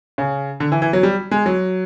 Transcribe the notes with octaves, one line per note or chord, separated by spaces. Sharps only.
C#3
D3
E3
E3
F#3
G3
G#3
F#3